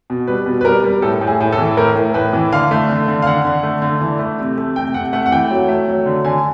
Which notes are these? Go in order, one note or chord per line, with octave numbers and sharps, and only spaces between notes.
B2
G3 B4
B2
B4
G3 A#4
G3
A2 A4
A2
G#4
A2
A4
E3
A2 A#4
A2
A2 B4
E3
D3 F5
A3
D3
D3
F5
D3 F#5
D3
A3
D3
E3
A3
C3
A3
C3 G5
C3 F#5
A3 F#5
F#5
E3 G5
F#3
A3
F#3
D3
D3 G#5